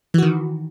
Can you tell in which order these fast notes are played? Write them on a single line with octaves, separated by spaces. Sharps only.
E3 F#4 D#3